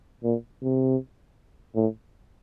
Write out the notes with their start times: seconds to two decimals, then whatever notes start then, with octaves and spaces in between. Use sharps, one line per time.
0.24 A#2
0.62 C3
1.75 A2